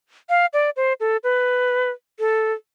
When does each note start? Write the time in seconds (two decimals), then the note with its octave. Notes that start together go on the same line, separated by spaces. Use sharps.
0.29 F5
0.53 D5
0.77 C5
1.00 A4
1.24 B4
2.19 A4